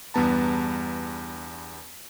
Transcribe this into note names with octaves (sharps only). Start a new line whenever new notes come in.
E2 G2 G3 B3 A5 A#5